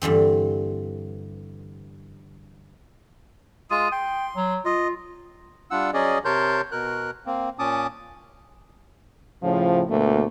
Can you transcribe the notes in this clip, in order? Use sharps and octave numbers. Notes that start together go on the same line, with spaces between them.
G2 D3 E3 C4
G#3 F4 D#6
G5 C6
F#3
F4 D#5
G3 D4 F4 F#5 E6
F#3 C#4 G#4 D5 D#5
C3 A#4 C#5 A5 C6 G6
B2 A#4 F#6
A#3 C4
A#2 C#4 A5 D6 D#6
A2 C#3 F3
D2 B2 A3 A#3